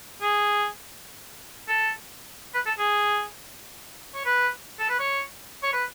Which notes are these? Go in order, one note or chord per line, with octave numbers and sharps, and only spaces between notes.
G#4
A4
B4
A4
G#4
C#5
B4
A4
B4
C#5
C#5
B4